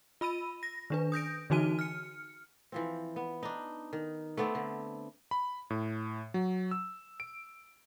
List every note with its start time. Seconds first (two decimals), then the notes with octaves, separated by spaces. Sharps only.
0.21 F4 B5 E6 D#7
0.63 A#6
0.90 D#3 D4 B4
1.12 D#6 G6 A#6 D7
1.50 D3 E3 D#4 F#4 G#5 D#7
1.79 F6 C#7
2.72 E3 F3 C4
3.16 B3
3.43 D4 D#4
3.93 D#3
4.37 A3 B3 C4 D5
4.55 D3
5.31 B5
5.70 A2
6.34 F#3
6.71 E6
7.20 D7